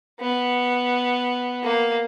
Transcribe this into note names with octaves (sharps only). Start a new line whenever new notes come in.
B3
A#3